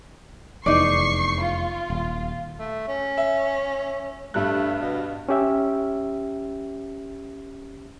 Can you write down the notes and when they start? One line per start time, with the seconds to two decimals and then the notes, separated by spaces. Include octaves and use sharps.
0.66 F1 E2 D#4 D5 C#6 C7
1.45 F4
1.90 D#1
2.59 A3
2.88 C#4
3.17 E5
4.34 G2 G3 A3 F#6
4.79 B2
5.29 C#4 G4 E5